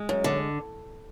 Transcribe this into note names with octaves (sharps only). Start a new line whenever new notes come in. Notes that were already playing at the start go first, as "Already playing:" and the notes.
Already playing: G#3
F#2
D3